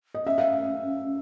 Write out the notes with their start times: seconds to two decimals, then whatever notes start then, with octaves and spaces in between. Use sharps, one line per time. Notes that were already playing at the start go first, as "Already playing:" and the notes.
0.14 D#5
0.26 C#4 E5
0.38 F5